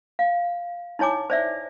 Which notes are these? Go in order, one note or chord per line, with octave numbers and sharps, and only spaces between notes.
F5
D#4 E4 C#5 G#5 D6
C5 D5 E5